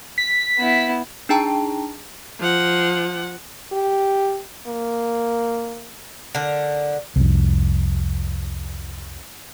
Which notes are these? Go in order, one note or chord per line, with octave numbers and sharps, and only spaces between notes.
B6
B3 E4
D4 D#4 G#4 G5 A5 A#5
F3 F#5
G4
A#3
D3 A#4
C2 F2